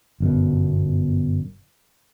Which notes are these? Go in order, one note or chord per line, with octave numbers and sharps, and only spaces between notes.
G1 F#2 B2